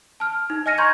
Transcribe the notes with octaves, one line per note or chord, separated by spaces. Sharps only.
A5 F6
D#4
D#5 G#5 F6 A#6 C#7 D#7
A#5 C6 C#6 G6 G#6